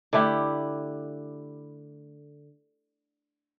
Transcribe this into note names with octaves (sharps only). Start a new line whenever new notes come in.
D3 A3 E4 G4